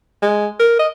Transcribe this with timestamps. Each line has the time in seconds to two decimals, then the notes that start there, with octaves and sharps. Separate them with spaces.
0.22 G#3
0.60 A#4
0.79 D#5